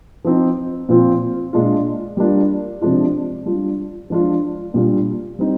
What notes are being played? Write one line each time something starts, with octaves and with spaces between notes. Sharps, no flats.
F3 C4 D#4
A#2 F3 C4 F4
A#2 G#3 D4 F4
G3 A#3 D4 F4
C3 F3 G#3 D4 F4
G3 D4 F4
F3 G#3 D4 F4
A#2 G3 D4 F4
G3 C4 D#4